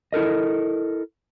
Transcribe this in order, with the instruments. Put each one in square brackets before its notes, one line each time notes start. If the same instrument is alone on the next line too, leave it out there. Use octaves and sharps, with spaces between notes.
[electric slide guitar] E4 A4 A#4 D#5